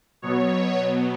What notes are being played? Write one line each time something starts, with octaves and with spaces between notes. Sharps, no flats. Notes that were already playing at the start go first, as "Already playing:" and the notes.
B2 F#3 B3 C#5